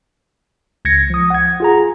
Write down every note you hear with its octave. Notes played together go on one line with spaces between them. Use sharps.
C#2 G#6 A#6 C#7
F3 D#6
F#5 G#6
F4 G#4 A#5